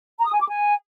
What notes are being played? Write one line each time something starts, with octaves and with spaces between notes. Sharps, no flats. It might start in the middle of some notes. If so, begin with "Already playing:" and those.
A#5
D#6
G#5
D6
G#5